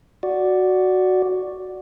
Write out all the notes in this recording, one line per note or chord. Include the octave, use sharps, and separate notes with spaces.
F#4 D5